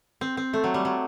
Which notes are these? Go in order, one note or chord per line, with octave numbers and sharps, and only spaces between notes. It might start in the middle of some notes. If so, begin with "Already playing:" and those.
C4
C4
A3
F#3
G3
F#3